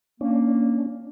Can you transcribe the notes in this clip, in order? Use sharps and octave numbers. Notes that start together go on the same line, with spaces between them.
A#3 C#4 D4